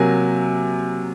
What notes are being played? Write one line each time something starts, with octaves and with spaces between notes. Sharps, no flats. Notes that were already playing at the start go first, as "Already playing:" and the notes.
Already playing: C3 F#3 A#3 G#5